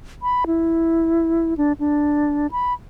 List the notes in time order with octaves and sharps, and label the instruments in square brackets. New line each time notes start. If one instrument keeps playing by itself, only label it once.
[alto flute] B5
E4
D4
D4
B5